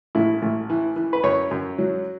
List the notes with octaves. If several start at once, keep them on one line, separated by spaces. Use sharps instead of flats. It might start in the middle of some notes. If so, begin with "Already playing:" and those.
A1 E4
A1
E3
E3
B4
F#2 C#5
F#2
F#3